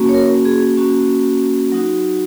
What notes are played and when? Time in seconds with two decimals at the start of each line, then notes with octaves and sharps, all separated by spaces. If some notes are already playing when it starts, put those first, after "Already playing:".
Already playing: A#3 C#4 F#4
0.09 C#5
0.14 A#4
0.45 G#4
0.77 A#3 C#4 F#4
1.72 F#3 D#4 F#4